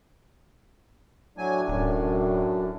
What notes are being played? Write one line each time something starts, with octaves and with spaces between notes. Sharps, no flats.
A2 F#3 A3 D4 G#5
D1 F#2